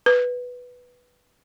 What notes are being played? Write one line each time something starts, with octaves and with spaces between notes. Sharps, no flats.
B4